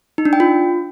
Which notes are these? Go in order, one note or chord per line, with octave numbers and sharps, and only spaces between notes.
D#4
D4
G5
F4